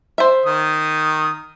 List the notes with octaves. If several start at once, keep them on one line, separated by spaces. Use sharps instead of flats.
C5 E5
D#3 D#6